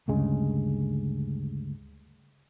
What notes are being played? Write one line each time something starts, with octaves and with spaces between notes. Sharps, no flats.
D2 G2 C#3 G#3